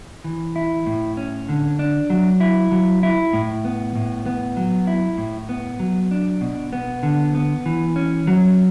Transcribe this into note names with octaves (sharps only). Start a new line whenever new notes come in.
E3
E4
A2
C#4
D3
D4
F#3
E4
F#3
E4
A2
B3
A2
B3
F#3
E4
A2
B3
F#3
D4
B2
B3
D3
B3
E3
C#4
F#3